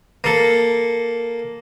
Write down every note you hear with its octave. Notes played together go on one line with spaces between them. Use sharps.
A#3 A4